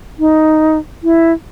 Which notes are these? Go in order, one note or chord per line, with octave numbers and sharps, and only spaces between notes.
D#4
E4